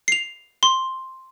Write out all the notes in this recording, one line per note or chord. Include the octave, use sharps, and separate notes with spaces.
C7 F7
C6